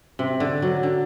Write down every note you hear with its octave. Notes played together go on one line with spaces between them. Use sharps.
C3
D3
F#3
D3